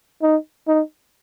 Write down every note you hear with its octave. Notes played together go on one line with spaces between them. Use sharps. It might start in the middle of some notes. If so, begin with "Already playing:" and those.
D#4
D#4